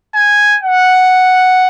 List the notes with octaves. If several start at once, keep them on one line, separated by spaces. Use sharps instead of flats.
G#5
F#5